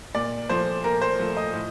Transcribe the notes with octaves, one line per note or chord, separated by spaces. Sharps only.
A#2 D5
F3 A3 C5
A#2 A#4
C5
F3 A3
D#5
A2